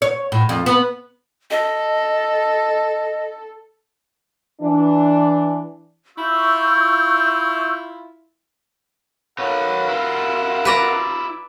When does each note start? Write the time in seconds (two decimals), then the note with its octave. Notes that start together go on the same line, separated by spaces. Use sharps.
0.02 C#5
0.32 A2
0.49 F2
0.66 B3
1.51 A4 D#5
4.60 E3 D4
6.18 E4 F4 C#6 E6 G6
9.39 A#4 B4 C#5 F5 F#5
9.88 E4 F4
10.65 B4 D5 A#5